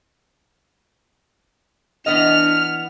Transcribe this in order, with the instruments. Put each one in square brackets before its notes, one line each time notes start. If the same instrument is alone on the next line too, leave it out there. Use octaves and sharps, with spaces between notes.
[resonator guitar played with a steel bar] E3 B3 D#5 [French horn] D4 [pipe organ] F6 [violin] F7